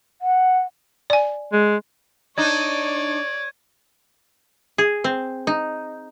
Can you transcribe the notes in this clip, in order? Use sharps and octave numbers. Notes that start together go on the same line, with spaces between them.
F#5
D5 G#5
G#3
D4 D#4 C#5 D5 G#6 D#7
G#4
C4
D#4